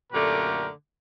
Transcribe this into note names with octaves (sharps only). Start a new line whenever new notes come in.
F#2 A#2 D3 A3 G4 A#4